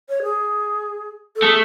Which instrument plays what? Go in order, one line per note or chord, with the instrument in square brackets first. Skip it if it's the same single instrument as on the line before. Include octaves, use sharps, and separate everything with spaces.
[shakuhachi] C#5
G#4
A4
[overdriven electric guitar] A3 [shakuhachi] G#4